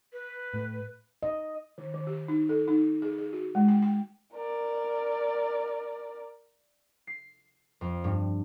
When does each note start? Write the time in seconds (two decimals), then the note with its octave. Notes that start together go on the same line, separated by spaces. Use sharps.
0.13 B4
0.54 A2
1.23 D#5
1.78 D#3
1.94 D#3
2.07 G4
2.28 D#4
2.49 A4
2.68 D#4
3.02 G#4
3.18 G#4
3.33 F#4
3.55 G#3
3.68 G5
3.82 G5
4.34 A#4 D5
7.07 C7
7.81 F2
8.04 G2